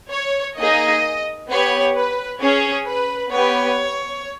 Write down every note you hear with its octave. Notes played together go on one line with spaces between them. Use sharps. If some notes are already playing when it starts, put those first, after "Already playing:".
C#5
A#3 D#4 G#4 D#5
B3 G4 C#5
B4
C#4 G#4 C#5
B4
B3 G4 C#5